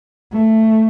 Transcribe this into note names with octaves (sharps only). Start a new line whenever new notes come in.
A3